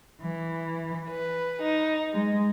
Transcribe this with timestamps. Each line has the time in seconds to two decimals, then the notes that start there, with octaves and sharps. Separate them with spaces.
0.22 E3
1.08 B4
1.62 D#4
2.13 G#3